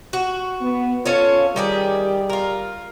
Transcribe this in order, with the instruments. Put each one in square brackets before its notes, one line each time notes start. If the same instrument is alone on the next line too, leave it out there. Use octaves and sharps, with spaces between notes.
[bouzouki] F#4
[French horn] B3
[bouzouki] C#4 A4 C#5 [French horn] F4
[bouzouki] D#3 G4 G#4 [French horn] G3
[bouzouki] F4 A#4